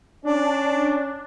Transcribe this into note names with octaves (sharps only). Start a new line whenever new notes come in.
C#4 D4 D5